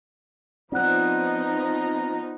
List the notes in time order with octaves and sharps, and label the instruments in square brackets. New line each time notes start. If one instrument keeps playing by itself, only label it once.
[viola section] F3 B3 D#4 [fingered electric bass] C4 [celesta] D5 F#5 F#6 [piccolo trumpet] A#5